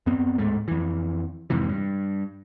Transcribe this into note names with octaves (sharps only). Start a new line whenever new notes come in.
F#2 B3 C4
D1 G#2 G#3 A3
F2 E3
F2 G#2 C3 E3
G2